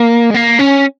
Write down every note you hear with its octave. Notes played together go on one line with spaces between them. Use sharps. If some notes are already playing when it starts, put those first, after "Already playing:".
Already playing: A#3
G#3
A#3
C#4